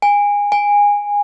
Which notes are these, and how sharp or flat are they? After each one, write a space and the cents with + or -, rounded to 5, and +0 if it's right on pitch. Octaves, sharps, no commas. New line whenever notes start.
G#5 -25
G#5 -20